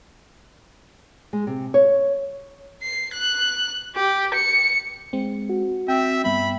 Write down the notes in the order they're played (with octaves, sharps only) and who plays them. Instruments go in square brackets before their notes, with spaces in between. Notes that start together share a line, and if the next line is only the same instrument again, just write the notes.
[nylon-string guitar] G#3
C3
C#5
[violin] C7
F#6
G4
C#7
[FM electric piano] G#3 C4
[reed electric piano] F#4
[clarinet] C4 [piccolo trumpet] E5 [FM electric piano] G5
[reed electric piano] G2 G3 B3 [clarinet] E5 [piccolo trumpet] B5